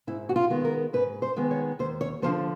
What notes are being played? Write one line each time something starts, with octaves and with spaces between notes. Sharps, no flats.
G#2 E4
F#4
F4
D#3 G#3 B3
A#4
G#2 B4
C5
D#3 G#3 B3
C#5
D#2 C5
C#5
D3 F3 A3 C5